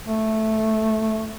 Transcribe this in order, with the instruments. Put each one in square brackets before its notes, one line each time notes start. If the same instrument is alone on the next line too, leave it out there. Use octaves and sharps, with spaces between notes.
[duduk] A3